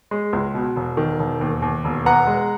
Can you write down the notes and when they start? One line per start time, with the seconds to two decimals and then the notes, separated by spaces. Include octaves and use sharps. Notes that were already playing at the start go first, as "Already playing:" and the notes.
0.11 G#3
0.33 C#2
0.54 B2
0.76 E1
0.97 D#3
1.19 E1
1.41 D#2
1.62 D#2
1.85 E1
2.05 B3 F#5 A#5
2.27 G#3